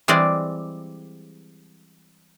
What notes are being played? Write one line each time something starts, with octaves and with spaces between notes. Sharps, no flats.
E3 G3 G#3 C4 G#4 D5